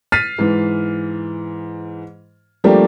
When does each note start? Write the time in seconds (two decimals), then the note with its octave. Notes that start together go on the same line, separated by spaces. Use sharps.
0.12 F6 A6 B6 C7 D#7
0.38 G#2 E3
2.64 F3 G3 A3 A#3 D4 G4